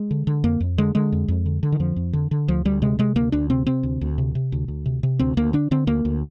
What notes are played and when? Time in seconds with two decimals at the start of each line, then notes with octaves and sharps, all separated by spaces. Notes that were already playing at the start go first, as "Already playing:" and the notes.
Already playing: G#3
0.11 D3
0.27 D3
0.44 F2 A#3
0.60 F2
0.78 D3 G#3
0.95 D3 G#3
1.12 F2
1.28 F2
1.46 D3
1.63 D3
1.72 D#3
1.80 F2 F3
1.96 F2
2.13 D3
2.31 D3
2.48 D2 F3
2.65 D2 G3
2.82 C3 G#3
2.99 C3 G#3
3.16 D2 A#3
3.32 D2 D4
3.50 C3 C4
3.66 C3 C4
3.83 D2
4.01 D2
4.18 C3
4.35 C3
4.52 D2
4.68 D2
4.86 C3
5.03 C3
5.19 D2 C4
5.37 D2 A#3
5.53 D3 D4
5.71 D3 C4
5.87 D2 A#3
6.05 D2